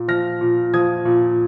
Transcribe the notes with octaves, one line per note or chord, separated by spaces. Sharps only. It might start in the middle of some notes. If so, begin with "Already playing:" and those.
Already playing: A#2
F3 F6 A#6
A#2
F3 D#6 G#6
A#2